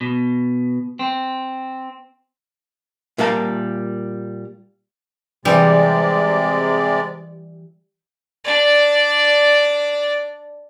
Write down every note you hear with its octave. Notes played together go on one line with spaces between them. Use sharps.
B2
C4
A#2 G3 A#4 F5 A5
C3 E3 G3 G#3 D5
D4 D5